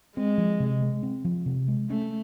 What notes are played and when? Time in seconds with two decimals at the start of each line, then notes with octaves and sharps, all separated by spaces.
0.16 G#3 C4
0.38 F3
0.60 C3
0.82 G#3
1.03 C4
1.25 F3
1.46 C3
1.68 G#3
1.90 A3 C#4